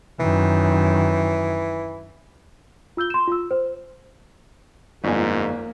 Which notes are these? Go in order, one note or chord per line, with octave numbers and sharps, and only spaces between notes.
F#2 D#3 E3
F4 E6 G6 G7
C6 E7
F4 E6
C5
G1 F2 G#2 A#3 G#5